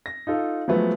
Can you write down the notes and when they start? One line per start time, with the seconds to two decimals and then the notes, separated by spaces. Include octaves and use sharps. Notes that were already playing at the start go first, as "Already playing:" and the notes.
0.06 A#6
0.27 D#4 F4 A4
0.68 F3 F#3 G#3 A3 B3